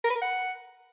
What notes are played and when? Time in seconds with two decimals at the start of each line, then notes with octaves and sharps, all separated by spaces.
0.04 A#4
0.10 B4
0.16 A#4
0.21 F#5